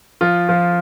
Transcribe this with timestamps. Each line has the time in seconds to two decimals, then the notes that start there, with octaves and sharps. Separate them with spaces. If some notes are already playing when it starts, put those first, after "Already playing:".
0.21 F3 F4
0.49 F3 F4